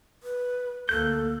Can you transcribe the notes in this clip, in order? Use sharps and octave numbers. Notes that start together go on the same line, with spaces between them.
B4
D2 A#3 A4 F#6 G6